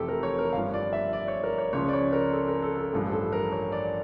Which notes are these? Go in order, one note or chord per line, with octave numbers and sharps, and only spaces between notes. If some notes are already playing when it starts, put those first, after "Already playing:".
Already playing: F1 F2 E3 G4 A4
A#4
C#5
A#4
G1 G2 F3 F5
D5
E5
D5
C#5
A#4
C#5
C#2 C#3 F3 C#5
D5
C#5
A#4
A4
A#4
A4
A4
A1 G2 F3
A4
A#4
C#5
D5